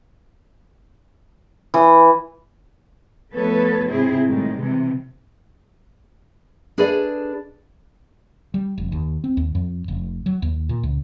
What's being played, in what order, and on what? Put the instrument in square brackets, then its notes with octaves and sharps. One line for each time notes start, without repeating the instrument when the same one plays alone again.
[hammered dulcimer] E3
[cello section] F3 A3 B3 A4 B4 C#5
G#2 C3 C4 E4 G#4
A2 D#3 G3 G#3
C3 E3
[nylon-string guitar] D4 G#4 A4 B4 D5 D#5
[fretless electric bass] G3
F1
D#2
C4
D#2
F2
F1
F#3
D#2
A#2
C#2